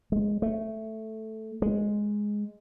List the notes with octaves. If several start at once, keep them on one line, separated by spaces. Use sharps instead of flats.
G#3
A3
G#3